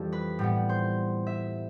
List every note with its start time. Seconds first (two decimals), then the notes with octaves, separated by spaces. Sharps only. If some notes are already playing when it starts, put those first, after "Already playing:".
Already playing: F2 E3 G3 G4 A4
0.13 B4
0.39 A2 G3 B3
0.69 C5
1.27 E5